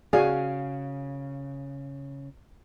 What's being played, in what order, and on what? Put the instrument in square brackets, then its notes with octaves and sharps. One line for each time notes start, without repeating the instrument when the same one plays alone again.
[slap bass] C#3 [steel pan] F#4 G#5 [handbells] G#4 D5 [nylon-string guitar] F5